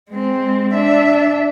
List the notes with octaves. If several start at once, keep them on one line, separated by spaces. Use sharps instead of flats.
G#3 C4
D4 E5